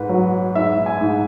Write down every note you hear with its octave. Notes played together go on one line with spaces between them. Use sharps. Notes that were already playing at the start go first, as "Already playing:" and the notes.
Already playing: G#2 B4
F#3
G#2 E5
G#5
G#2